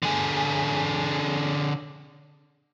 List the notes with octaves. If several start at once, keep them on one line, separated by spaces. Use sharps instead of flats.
D3 G#4